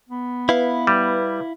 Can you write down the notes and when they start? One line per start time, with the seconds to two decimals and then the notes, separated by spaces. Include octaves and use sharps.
0.09 B3
0.49 E4 B4 F5
0.87 G3